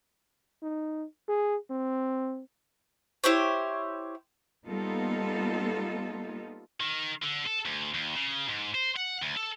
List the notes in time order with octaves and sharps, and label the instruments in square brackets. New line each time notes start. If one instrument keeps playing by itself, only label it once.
[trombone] D#4
G#4
C4
[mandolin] E4 G4 C5 C#5
[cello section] G3 A#3 B3 D#4 F4 A4
[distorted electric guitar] D#3
D3
A4
D2
D#2
C#3
G#2
C5
F#5
D2
A4